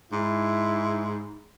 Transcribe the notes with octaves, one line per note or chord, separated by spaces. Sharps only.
G#2 E4